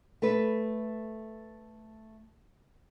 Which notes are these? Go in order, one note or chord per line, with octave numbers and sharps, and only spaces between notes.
A3 A4 B4